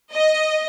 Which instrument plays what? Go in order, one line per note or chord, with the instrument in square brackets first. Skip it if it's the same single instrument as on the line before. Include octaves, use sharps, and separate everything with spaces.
[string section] D#5